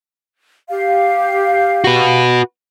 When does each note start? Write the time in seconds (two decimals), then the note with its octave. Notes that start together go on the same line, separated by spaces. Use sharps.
0.69 G4 F5
1.84 F#4 B4